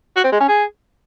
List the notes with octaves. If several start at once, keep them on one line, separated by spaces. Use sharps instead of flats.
F#4
C4
G#3
C#4
G#4